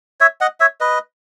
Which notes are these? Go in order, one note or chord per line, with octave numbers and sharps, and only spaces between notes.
C#5 E5
D#5 F#5
C#5 E5
B4 D#5